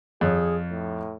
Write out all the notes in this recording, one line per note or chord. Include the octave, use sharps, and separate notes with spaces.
F2 G#4 C#5
A2